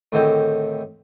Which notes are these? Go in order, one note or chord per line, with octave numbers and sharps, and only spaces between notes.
A2 D3 D#3 C4 G4 G#4